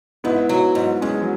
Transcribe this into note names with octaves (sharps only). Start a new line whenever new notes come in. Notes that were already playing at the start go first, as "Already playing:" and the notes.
G#2 B3 E4
F#3
G#2
G#2 G#3 C#4
F#3